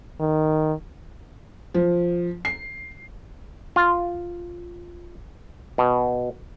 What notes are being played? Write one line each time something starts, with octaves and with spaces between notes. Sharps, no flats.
D#3
F3
C7
F4
B2